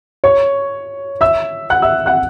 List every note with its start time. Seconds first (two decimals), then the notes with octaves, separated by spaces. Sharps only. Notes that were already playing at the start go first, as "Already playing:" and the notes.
0.24 C#5 C#6
1.21 E5 E6
1.70 F#5 F#6
1.82 E5 E6
2.06 F#5 F#6